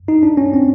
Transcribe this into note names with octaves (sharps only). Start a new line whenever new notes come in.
D#4
D4
C#4
C4